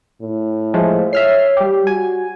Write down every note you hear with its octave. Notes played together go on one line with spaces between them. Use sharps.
A2
F3 G#3 A3
C#5 E5 F6 C7
G3 G4
F#4 G#5